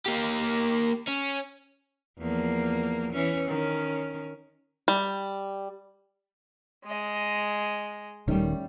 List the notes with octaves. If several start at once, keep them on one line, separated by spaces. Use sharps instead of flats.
A#3 G4
C#4
E2 F3 A#3
E3 C#4
D#3 C#4
G3
G#3 D#5
D#1 D#3 G3 A3 C#4